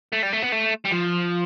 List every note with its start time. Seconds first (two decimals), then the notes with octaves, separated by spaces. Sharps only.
0.13 A3
0.23 G3
0.33 A3
0.42 B3
0.52 A3
0.85 G3
0.92 F3